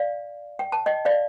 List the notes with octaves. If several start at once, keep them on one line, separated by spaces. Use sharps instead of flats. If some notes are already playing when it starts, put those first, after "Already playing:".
Already playing: D5 F5
G5
A5
D#5 G5
D5 F5